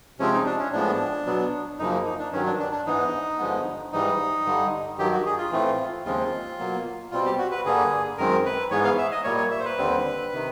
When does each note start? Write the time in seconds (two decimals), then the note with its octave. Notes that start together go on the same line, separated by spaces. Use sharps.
0.19 C3 F3 G#3 C4 C#4
0.33 D#4
0.46 D4
0.59 C#4
0.73 A2 F3 G#3 B3 D4
1.26 B2 F#3 B3
1.79 F#2 C#3 F3 A#3 D#4
2.05 D#4
2.19 D4
2.32 G2 D#3 F#3 C#4
2.46 D4
2.59 D4
2.72 D4
2.85 G#2 E3 G#3 B3 D#4
3.39 G2 D3 F3 G#3 B3
3.92 G#2 E3 G3 D#4
4.46 G2 D3 G3
4.98 G2 D#3 F#3 G4
5.12 F#4
5.26 G#4
5.38 F4
5.52 A2 E3 A3 C4
6.05 D#2 C#3 F3 G#3 C4 F4
6.59 B2 F#3 A#3
7.11 B2 G3 C4 F4
7.26 G4
7.38 F#4
7.51 B4
7.65 G2 D3 G3 A#3 G#4
8.18 F#2 D#3 G#3 C4 A#4
8.45 B4
8.71 G#2 E3 G#3 B3 C#5
8.84 F5
8.98 E5
9.12 D#5
9.24 A#2 G3 A#3 C#5
9.38 C#5
9.51 E5
9.60 C5
9.65 B4
9.78 D#2 D3 G3 C4
10.32 C3 D#3